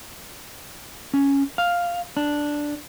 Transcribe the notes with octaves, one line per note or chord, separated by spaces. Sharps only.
C#4
F5
D4